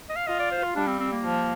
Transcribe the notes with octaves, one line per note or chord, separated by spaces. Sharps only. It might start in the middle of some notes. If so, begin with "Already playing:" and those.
D#5
F5
F4 D#5
D5
C5
F4
G3 D4
C4
C4
A#3
F3